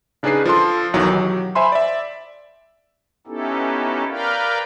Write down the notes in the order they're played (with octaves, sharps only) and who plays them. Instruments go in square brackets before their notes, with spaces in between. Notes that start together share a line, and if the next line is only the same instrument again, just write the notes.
[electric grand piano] C#3 D4 D#4 G#4 B4 C7
F3 A4 C6
B1 D#3 E3 F#3
F#3 G4
C5 E5 G#5 B5 C6
D5 E5
[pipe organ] B3 C#4 D#4 E4 G4 A4
A#4 B4 D5 F5 G5